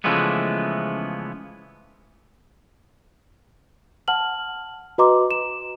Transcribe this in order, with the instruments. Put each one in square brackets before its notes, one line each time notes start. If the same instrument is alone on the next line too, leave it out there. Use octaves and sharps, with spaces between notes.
[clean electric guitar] C#3 E3 F3 G#3 A3 B3
[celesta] F#5 A5 F6 F#7
F#4 B4 D#5 A#5 C6 D6
E7